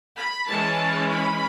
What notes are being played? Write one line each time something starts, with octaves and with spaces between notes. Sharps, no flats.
B5
E3 G#3 C#4 A5
B5